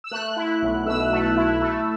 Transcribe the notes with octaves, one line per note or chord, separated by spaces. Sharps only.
E6
A3 F#6
E4
B1
B2 E6
A3
E4
A3